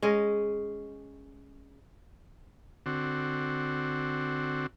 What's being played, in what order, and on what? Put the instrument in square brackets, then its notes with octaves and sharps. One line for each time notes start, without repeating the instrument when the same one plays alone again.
[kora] G#3 C#4 D#5
[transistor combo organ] D3 C4 F#4